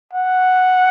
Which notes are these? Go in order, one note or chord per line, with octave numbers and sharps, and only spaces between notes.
F#5